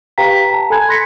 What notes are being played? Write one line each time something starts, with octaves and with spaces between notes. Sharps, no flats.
G4 B4 F5 G5 A#5 B6
A5 A#5
A4 G#5 B5 F#6 G#6
B5 C6 F#6 A#6 B6 C#7